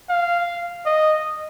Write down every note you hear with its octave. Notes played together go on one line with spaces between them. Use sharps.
F5
D#5